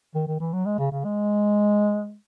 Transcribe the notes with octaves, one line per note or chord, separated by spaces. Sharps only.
D#3
D#3
E3
F#3
G#3
C#3
C#3
G#3